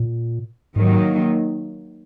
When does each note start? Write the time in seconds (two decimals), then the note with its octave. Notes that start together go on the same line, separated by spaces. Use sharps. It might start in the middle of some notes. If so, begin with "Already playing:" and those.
Already playing: A#2
0.76 G#2 D#3 F#3 A#3